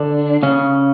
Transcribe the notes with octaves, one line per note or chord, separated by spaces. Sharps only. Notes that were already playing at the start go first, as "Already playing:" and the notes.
Already playing: D3 D4
C#3 C#4